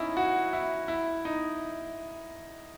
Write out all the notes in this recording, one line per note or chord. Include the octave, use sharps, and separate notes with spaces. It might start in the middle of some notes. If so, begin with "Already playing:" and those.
Already playing: C#4 D#4 E4
F#4
E4
E4
D#4